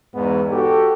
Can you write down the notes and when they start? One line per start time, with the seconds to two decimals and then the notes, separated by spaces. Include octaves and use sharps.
0.15 E2 G#2 B3 D#4
0.51 F#4 G4 A4